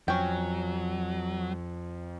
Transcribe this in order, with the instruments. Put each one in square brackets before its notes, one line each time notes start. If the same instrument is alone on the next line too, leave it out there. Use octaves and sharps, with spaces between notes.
[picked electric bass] F2 [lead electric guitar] F#3 [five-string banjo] C#4 G5